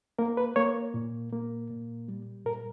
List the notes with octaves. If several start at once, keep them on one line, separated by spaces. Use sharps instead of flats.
A#3 A#4
B4
A#3 C#5
A#2
A#3
A#2
G3
A#2 A#4